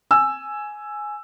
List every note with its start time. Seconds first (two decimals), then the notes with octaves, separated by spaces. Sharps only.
0.11 G#5 E6